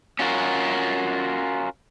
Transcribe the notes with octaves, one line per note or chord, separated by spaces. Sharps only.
C#4 F4 F#4 A#4